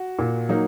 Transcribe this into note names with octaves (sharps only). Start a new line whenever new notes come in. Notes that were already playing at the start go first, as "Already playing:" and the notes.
Already playing: F#4
A#2
F#3 A#3 D#4